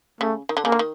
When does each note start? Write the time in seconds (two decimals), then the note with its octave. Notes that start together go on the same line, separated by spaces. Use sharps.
0.20 C#3 A3
0.49 D#3
0.57 D3
0.64 C#3 A#3
0.72 D3
0.79 D#3